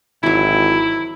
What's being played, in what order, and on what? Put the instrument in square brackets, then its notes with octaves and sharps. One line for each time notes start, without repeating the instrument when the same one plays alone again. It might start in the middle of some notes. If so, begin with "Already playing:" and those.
[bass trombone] G#1 [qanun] E3 F#3 [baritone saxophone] E4